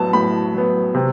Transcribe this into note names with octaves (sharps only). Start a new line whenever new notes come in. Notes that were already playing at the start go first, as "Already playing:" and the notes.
Already playing: A2 F#3 B3 A5
A2 B5
F#3 B3
C3